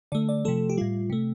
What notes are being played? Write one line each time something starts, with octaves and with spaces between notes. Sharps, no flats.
D3 A3 D5
D5
C3 F3 A3 A4
G4
A2 G3 F4
C3 A3